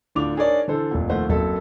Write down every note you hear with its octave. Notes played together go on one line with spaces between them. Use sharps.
D1 D2 D4 F4 D6 F7
D4 D#4 G#4 A#4 C#5 D5
D3 E3 A4 C5
F1 A#2
D#2 F3 A3 C5 F#5
F#1 F#3 A#3 C4 A4 E5